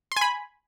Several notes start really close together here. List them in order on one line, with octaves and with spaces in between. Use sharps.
C6 G#5 B5